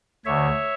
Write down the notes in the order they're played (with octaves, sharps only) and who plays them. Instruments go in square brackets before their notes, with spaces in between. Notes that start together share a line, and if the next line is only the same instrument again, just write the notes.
[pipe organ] D2 D3 C#5 E5